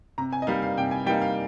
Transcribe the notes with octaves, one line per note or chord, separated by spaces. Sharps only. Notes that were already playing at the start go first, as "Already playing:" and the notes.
C3 A#5
G#5
D#5
G3 A#3 D#4 F5
F5
C3 G5
G#5
G3 A#3 D#4 G5
F5